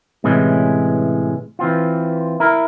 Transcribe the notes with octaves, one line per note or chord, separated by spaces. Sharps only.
A2 C3 E3 G#3 C#4
E3 C4 F4
E4 A#4